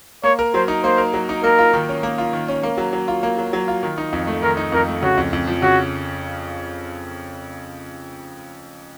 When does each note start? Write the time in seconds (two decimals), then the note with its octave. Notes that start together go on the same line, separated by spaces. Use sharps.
0.23 A#3 C#5
0.39 A#4
0.54 F#3 C5
0.68 D#4
0.84 A#3 C5
0.98 A#4
1.14 F#3
1.29 D#4
1.43 A#3 A#4
1.59 F4
1.73 D#3
1.89 C#4
2.03 A#3
2.18 F4
2.33 D#3
2.48 C#4
2.63 A#3
2.78 F#3
2.93 F#3
3.08 F4
3.23 A#3
3.38 F#3
3.53 F#3
3.68 F4
3.83 D#3
3.98 D#4
4.13 F2
4.27 A3
4.42 D#3 A#4
4.57 D#4
4.72 F2 A#4
4.88 A3
5.02 C#3 F#4
5.17 F2
5.33 F2
5.48 F3
5.62 C#3 F#4